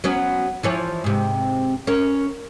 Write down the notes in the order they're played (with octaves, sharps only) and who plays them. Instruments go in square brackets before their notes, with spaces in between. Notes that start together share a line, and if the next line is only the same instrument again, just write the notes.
[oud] F#3 B3 C#4
E3 F3 C#5
G#2 C3
C#4 A#4